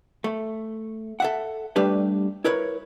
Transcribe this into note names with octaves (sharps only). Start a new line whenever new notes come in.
A3
A4 E5 F#5
G3 A3 D4 G4 B4
E4 A#4 B4 C#5